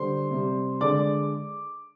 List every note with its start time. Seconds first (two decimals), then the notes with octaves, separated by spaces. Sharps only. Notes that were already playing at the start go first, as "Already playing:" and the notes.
Already playing: D3 G3 C5 C6
0.31 C3 G3
0.81 D3 G#3 D5 D6